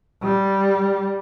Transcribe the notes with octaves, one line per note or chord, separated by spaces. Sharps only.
G3